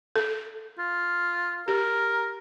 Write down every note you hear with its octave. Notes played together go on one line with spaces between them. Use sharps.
A4
F4
G4 A#4